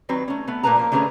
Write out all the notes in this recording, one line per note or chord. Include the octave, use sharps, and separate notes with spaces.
D#3 F#3 C4 B4
A3 C#4
A3 B3
A#2 A3 A#4 B4 A5 A#5
F3 A#3
D3 A3 C#4 G#4 B4 A#5